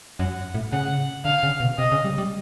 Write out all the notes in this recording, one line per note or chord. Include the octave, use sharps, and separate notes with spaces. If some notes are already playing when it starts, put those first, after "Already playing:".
F#2 F#5
A2
C#3 F#5
D3 F5
C#3
B2
C3 D#5
C#3
G3
G3